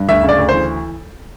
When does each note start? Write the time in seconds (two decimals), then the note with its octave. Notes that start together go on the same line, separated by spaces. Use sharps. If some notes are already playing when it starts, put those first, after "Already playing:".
Already playing: G2
0.09 D2 E5
0.23 C#3
0.29 D5
0.39 D2
0.49 E3 C5